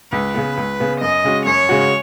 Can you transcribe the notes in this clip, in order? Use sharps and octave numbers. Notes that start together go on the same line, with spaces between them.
C#2 B4
C#3 B3
C#2
C#3 B3
F#2 D#5
C#3 G#3 C#4 F#4
F#2 C#5
C#3 G#3 C#4 F#4